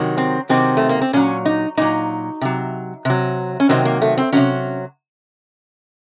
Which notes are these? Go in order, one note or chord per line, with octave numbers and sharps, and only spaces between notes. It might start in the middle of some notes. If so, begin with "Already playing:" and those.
Already playing: C3 D#3 F#3
C4
C3 D#3 F#3 C4
A3
A#3
C4
A#2 F#3 C#4
D#4
A#2 F#3 D#4
C3 F#3
C3 F#3
C#4
C3 D#3 F#3 C4
A#3
A3
C4
C3 D#3 F#3 C#4